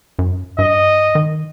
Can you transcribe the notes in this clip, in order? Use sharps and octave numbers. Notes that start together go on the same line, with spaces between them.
F#2
G2 D#5
D#3